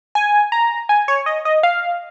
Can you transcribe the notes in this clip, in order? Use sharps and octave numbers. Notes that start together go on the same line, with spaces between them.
G#5
A#5
G#5
C#5
D#5
D#5
F5